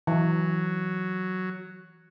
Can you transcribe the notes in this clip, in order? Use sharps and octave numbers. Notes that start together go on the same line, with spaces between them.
E3 F#3